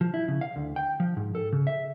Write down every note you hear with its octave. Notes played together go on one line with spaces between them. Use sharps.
F3
E4
C#3
F5
D2
G5
F3
G#2
A4
C#3
E5